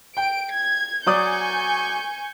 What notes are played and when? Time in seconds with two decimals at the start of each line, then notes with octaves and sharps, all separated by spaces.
0.17 G5 D7
0.52 G#6
1.06 F#3 D5 G#5 C#6 D#6 G6